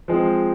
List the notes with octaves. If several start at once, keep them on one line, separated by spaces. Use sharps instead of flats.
F3 G#3 C4